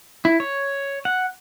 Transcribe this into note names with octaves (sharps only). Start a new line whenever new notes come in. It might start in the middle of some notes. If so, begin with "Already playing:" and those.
E4
C#5
F#5